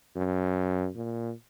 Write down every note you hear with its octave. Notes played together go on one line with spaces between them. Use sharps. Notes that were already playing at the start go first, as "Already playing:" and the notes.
F#2
A#2